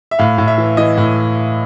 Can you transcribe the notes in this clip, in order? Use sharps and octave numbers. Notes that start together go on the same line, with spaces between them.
E5
A2 F5
A2
E5
E3
E3 D#5
A2